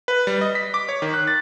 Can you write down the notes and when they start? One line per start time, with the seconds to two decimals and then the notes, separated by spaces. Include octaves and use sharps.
0.08 B4
0.27 G3
0.41 D#5
0.55 B6
0.74 D6
0.89 C#5
1.02 D#3
1.14 F#6
1.28 A6